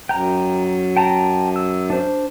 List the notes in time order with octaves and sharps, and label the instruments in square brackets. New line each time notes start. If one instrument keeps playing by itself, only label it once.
[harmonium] F#2 [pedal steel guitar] G5 A#5
[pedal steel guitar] G5 A5 A#5
E6
D4 C5